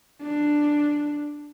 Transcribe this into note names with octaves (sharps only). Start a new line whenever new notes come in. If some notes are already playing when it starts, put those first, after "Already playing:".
D4